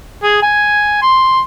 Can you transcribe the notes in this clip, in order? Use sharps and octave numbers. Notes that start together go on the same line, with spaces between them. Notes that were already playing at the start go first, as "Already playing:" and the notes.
G#4
G#5
C6